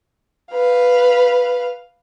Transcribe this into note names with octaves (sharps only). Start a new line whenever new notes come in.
B4 F5